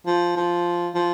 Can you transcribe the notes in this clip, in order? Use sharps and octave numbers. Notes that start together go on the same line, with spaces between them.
F3
F3
F3